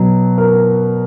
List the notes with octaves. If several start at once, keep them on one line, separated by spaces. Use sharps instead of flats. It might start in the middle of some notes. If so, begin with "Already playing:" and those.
Already playing: B2 F#3
A#4